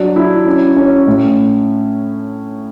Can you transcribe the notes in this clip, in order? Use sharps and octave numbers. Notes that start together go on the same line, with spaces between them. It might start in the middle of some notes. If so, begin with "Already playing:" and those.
Already playing: F#3 D4
E4
C#4
C#4
A2